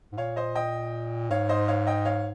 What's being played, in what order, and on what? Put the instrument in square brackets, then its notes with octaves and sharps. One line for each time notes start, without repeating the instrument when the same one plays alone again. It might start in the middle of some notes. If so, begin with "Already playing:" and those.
[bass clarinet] G#2
[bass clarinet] A#2 [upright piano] C#5 F5
[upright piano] C5 D#5
D#5 G5
[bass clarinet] G#2 [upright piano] C#5 F5
[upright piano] C5 D#5
C#5 F5
D#5 G5
C#5 F5